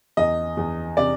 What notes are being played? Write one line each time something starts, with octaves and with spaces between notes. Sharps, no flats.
E2 D#5
E2
C3 D5